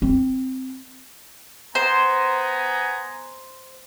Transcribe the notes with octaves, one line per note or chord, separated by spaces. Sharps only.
C4
B3 C5 G#5 A#5